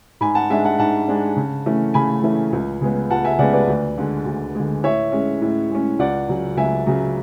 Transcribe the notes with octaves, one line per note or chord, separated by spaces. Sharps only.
G#2 G#5 B5
F#5 A5
G#3 D4 E5 G#5
F#5 A5
G#2 F#5 A5
G#3 D4
C#3
E3 A3 C#4
C#3 G#5 B5
E3 A3 C#4
C#2
C#3 G#3 B3
C#2 F#5 A5
E5 G#5
C#3 G#3 B3 D5 F#5
B4 D5
D2
D3 G#3
D2
D3 G#3
A2 C#5 E5
G#3 C#4
A2
G#3 C#4
C#2 D5 F#5
C#3 F#3
C#2 E5 G#5
C#3 F#3